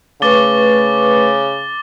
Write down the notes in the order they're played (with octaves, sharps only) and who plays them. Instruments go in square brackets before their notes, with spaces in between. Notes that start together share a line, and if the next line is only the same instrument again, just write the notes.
[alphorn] C#3 [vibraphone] A3 B4 C#6 [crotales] D6 A6 G7